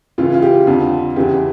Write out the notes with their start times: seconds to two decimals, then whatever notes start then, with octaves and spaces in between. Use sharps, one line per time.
0.18 C#2 C#3 E3 F4
0.34 F4
0.42 G4
0.67 F2 D3 F4
1.16 E2 C#3 E3 G4